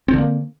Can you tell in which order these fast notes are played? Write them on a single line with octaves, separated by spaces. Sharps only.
C4 D3 A#3